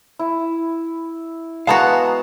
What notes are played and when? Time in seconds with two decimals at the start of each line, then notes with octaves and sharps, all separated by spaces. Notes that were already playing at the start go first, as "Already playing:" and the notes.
0.19 E4
1.67 G#3 B3 F#4 F5 A5 A#5